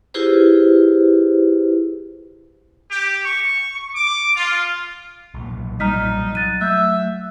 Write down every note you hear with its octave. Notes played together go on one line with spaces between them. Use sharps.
E4 F4 G4 G#4 B4 C5
G4
C#6
D6
F4
B1 A#2
B1 A#2 G3 D#4 A#5 F6 B6
F#3 F#6 A6 D#7
A3 E5 F#6 G6